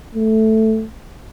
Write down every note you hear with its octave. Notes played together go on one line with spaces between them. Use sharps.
A3